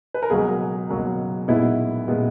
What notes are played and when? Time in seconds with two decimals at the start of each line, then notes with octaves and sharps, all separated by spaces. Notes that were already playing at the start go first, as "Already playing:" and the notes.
0.14 B4
0.22 A#4
0.30 C#2 B2 F#3 A#3 G#4
0.89 C#2 B2 F#3 A#3
1.48 B1 A#2 G#3 B3 E4
2.08 A#2 G#3 B3